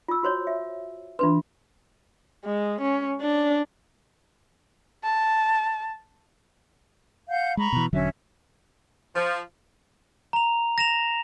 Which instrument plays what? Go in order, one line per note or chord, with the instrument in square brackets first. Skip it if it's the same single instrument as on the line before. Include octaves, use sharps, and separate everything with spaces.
[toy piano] F4 E6
F#4 C5 C#5
E5
[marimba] E3 D4 C6 [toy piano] F4 B4
[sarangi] G#3
C#4
D4
[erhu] A5
[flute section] F5 F#5 G6
[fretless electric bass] G#3 [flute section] A#5 B5 C#6
[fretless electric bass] B2 E3
[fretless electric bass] E1 D3 F#3 [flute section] C#4 E5
[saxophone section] F3
[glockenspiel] A#5 F7
A#6 E7 F7